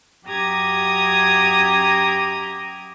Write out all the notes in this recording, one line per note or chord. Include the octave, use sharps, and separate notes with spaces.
F#2 G4 A#5 D#6 G#6